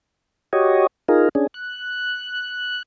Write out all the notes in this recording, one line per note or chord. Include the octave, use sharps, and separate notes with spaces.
F#4 G4 C#5 D#5
D#4 F4 G#4 A#4
C#4 D4 G#4
F#6